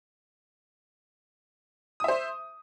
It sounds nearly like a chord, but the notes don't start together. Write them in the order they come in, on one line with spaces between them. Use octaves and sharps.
D#6 E5 C5